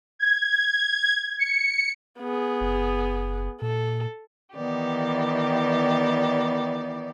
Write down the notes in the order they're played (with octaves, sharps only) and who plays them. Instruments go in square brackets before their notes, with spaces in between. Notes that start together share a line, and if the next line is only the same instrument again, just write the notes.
[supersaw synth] G#6
C#7
[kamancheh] B3 G#4
[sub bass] F#1
[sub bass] A#2 [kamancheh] A4
[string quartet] D#3 E3 B3 G4 D5